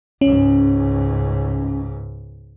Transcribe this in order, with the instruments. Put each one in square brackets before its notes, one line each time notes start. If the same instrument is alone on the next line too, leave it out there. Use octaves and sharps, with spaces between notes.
[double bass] C#2 G#2 [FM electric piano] C#4